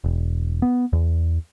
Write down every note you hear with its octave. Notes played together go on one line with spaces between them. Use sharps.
E1
B3
E2